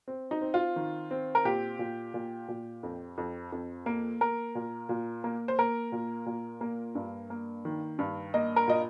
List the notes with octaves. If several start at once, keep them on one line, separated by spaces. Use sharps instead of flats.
C4
D#4
C4
F4
D#3
C4
A#4
A#2 G4
A#2
A#2
A#2
F2
F2
F2
A#3
A#3 A#4
A#2
A#2
A#3
C5
A#3 A#4
A#2
A#2
A#3
G2
A#3
D#3
G2
A#3 D#5
A#4
A#2 D#5